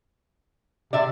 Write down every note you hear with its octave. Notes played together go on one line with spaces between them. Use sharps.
C3 D5 E5